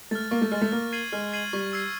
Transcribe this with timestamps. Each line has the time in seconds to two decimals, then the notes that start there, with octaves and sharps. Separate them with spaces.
0.11 A3 F6 A6
0.31 A#3 C#6
0.41 A3
0.52 G#3 F6
0.55 A6
0.61 A3
0.72 A#3 F6
0.92 G#6 C7 D#7 F#7
1.12 G#3 F6
1.33 G#6 C7 D#7 F#7
1.53 G3 C#6
1.73 E6 G#6 C7